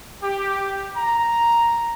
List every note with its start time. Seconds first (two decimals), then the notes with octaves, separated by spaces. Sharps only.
0.23 G4
0.97 A#5